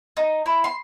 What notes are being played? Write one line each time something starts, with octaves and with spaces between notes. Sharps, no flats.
D#4
E4
C6